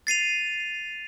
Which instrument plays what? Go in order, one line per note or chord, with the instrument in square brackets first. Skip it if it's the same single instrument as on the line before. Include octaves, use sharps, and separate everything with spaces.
[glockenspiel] A6 C7 D#7 F7